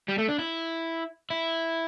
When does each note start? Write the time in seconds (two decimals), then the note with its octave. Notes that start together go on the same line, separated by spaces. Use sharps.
0.08 G3
0.18 A3
0.28 D4
0.38 E4
1.30 E4